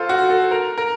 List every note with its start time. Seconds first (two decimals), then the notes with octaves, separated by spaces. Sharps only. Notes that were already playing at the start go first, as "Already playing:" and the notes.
Already playing: F4 A4 C5
0.09 F#4
0.30 A4
0.51 A#4
0.78 A#4